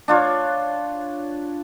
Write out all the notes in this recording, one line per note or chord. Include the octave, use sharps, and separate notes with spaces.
D4 F4 C#5